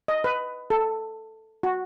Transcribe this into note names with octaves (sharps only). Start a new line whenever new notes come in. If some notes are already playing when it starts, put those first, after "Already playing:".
D#5
B4
A4
F#4